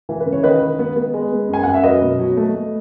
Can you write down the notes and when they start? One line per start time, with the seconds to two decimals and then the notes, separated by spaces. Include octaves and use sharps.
0.09 E3
0.21 B4
0.26 C#3
0.32 C#5
0.43 D#3 B4 D#5
0.61 D#3
0.79 B3
0.96 B3
1.14 G#3
1.32 B3
1.48 F#2
1.54 G#5
1.63 F#2 F#5
1.74 E5
1.84 F#3 B4 D#5
2.02 B2
2.19 F#3
2.37 A3
2.54 A3